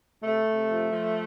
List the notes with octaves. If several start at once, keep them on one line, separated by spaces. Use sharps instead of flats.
C3 A3
C3
F3
F3